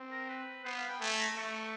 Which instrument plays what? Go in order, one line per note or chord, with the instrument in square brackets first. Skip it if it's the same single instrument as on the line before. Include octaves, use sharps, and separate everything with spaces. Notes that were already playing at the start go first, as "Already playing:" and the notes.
Already playing: [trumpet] C4
[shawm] A#4
B4
[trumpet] B3 [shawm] C5
[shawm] F5
G5
[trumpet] A3 [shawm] G#5
[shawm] A#5
[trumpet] A3 [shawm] C#6